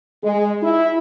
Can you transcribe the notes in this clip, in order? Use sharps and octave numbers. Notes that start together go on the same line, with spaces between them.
G#3
E4